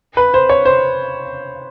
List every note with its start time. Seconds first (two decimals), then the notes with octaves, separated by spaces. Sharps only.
0.17 B4
0.34 C5
0.49 C#5
0.65 C5